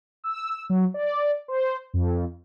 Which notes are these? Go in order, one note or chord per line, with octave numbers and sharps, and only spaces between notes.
E6
F#3
D5
C5
F2